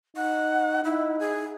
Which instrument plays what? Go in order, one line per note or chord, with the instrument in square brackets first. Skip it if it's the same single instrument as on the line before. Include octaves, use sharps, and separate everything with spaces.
[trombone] D#4 [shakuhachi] F#5
[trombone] D#4 [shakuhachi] E4
[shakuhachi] G#4